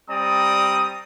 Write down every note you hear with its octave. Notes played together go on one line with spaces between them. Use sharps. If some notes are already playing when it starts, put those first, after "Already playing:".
G3 C4 D5 A#5 D#6